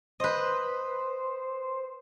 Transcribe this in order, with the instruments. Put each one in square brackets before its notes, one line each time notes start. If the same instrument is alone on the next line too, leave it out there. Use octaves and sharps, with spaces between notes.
[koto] B4 D#5 [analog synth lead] C5